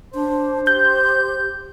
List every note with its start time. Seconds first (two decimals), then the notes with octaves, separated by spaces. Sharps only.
0.14 D4 C5
0.67 G4 G6